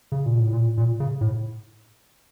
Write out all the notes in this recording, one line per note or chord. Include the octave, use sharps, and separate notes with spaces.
C#3
A#2
A2
A#2
A#2
C#3
A2